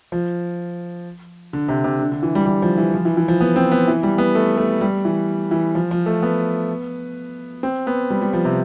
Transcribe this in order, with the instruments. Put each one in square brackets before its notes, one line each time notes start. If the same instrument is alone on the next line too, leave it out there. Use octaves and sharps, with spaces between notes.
[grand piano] F3
D3
C3
C3
D3
D3
E3
G3
G3
F3
E3
F3
E3
E3
F3
B3
C4
B3
E3
G3
B3
A3
A3
G3
E3
E3
F3
F3
A3
B3
C4
B3
G3
G3
F3
C3